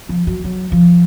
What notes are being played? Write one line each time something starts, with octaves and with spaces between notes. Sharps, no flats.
F3
F#3
F#3
F3